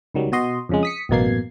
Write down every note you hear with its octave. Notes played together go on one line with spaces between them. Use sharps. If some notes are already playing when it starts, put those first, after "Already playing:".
C#2 D#3 F#3 G3
B2 F#4 D#5 C6
F2 C#3 G#3
D#6 B6 C#7
A1 F#2 B2 A#3 G#6 C7